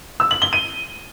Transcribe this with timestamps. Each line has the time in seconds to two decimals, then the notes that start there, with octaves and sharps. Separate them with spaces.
0.20 E6
0.31 F#7
0.42 G7
0.53 D#7